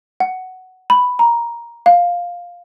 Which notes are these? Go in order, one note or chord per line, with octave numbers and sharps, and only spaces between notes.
F#5
B5
A#5
F5